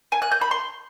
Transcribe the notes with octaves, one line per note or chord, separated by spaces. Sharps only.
G#5
F#6
G6
B5
C6